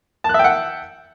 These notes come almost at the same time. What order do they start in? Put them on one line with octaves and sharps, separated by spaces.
A5 F#6 E5 G5 F#5